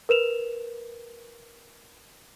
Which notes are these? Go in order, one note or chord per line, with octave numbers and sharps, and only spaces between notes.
A#4 B4 E7 F7